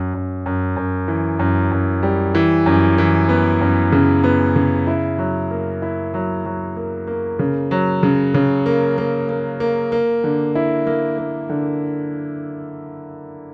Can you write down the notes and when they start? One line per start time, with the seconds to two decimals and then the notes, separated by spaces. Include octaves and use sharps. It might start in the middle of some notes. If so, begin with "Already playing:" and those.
Already playing: F#2
0.14 F#2
0.46 F#2
0.77 F#2
1.08 E3
1.39 F#2
1.71 F#2
2.03 G3
2.35 E3
2.66 F#2
2.98 E3
3.29 B3
3.61 F#2
3.92 C#3
4.24 B3
4.56 C#3
4.87 E4
5.18 F#3
5.51 A#3
5.82 E4
6.14 F#3
6.46 F#3
6.76 A#3
7.07 A#3
7.39 C#3
7.71 F#3
8.03 C#3
8.34 C#3
8.66 A#3
8.98 A#3
9.29 A#3
9.60 A#3
9.92 A#3
10.24 D3
10.55 E4
10.87 A#3
11.18 A#3
11.49 D3